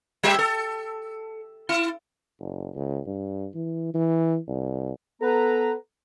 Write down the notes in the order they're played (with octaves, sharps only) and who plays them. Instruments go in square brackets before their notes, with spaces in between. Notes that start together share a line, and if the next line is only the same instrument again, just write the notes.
[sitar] G3 G4 E5
A4
E4
[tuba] F#1
C#2
G2
E3
E3
C2
[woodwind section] B3 B4 A#5 [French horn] A4